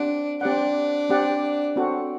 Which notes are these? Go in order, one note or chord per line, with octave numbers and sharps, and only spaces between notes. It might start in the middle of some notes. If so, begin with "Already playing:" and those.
Already playing: C4 D4 G4 D5 F#5
C4 D4 G4 D5 F#5
C4 G4 D5 F#5
C4 F#4 A4